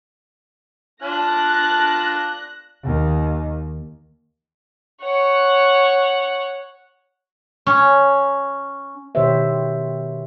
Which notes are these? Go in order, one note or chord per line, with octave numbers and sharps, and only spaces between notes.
D4 F4 A5 F#6 A#6
D#2 D#3
C#5 F#5
C#4
B2 D#3 G4 C5 C#5 E5